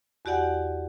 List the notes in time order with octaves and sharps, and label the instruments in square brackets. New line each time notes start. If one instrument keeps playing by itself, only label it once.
[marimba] E2 F#4 G4 D5 F#5 G5